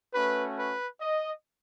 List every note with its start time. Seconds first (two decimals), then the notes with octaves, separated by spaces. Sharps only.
0.13 A3 C#4 F#4 B4
0.57 B4
1.01 D#5